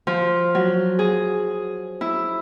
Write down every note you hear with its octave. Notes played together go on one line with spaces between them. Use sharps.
F3
F#3
G#4
E4